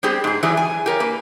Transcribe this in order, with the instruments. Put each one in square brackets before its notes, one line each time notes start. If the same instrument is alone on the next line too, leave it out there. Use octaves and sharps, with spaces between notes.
[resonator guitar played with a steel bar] G3 B3 C4 G4 G#4
G#2 G#4
E3 F#3 G3 G#4 B4 D5
G#5
G4 A#4 C#5
A#3 B4